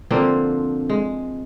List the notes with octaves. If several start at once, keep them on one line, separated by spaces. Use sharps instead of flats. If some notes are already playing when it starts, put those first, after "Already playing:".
D3 F3 A#3 C4
G#3